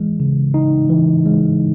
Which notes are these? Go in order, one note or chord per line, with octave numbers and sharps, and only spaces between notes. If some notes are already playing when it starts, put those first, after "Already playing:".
Already playing: E3 G#3
C#3
D#4
E3
G#3